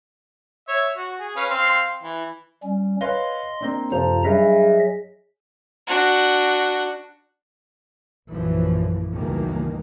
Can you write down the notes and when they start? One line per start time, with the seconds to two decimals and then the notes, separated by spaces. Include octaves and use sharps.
0.68 C#5 E5
0.96 F#4
1.20 G#4
1.37 C#4 B4 F5
1.50 C4 F5 C6
2.03 E3
2.63 G3 C#4
3.01 B4 C#5 D#5 F5 C6
3.61 A#3 C4 D4
3.92 F#2 C3 F3 A4 C5 A#5
4.24 G2 F#3 G#4 D#5 E5
5.87 D4 F#4
8.28 A#1 F#2 E3 F3
9.11 C#2 G2 B2 D#3 E3 A#3